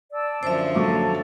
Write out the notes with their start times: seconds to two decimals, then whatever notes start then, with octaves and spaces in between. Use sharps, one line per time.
0.13 D5 A5 E6
0.43 F#2 D3 F3 C5 E5
0.75 F#3 A4 D6